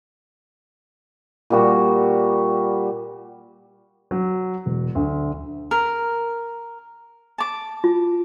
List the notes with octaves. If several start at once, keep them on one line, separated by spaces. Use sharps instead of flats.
A#2 G3 F#4
F#3
E1
D2
A#4
A5 D6
F4